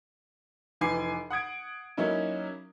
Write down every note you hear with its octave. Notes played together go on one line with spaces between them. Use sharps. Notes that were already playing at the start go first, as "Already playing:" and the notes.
F1 E3 G#5 D6 C7
F#5 D#6 G#6 D7
F#3 A#3 C#4 D#4 E4